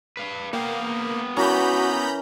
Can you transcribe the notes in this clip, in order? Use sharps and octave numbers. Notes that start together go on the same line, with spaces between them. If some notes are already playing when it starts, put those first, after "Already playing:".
B4 F5
A#3 B3 F5 G5
E3 C#4 F#4 A#4 A#5 B5 G6